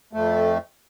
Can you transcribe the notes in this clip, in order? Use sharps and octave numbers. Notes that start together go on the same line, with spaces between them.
F2 A3